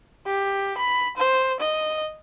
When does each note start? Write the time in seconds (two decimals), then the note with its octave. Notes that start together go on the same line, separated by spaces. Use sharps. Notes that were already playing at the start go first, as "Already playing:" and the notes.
0.26 G4
0.78 B5
1.17 C5
1.60 D#5